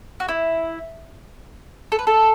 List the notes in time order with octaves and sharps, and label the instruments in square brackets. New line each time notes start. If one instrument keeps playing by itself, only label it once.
[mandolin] F#4
E4
A4
B4
A4